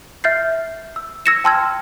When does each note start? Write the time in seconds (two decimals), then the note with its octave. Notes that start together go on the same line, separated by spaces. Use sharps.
0.24 E5 F6 G6 A6 C7
0.96 E6
1.26 E6 G#6 A#6 C#7 E7
1.44 G5 A5 C6 E6 F6 G#6